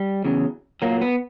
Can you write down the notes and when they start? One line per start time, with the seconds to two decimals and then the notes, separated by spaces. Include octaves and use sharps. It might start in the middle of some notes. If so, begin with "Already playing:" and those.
Already playing: G3
0.25 E2 C#3 F#3
0.82 A#2 F#3 A#3
1.01 B3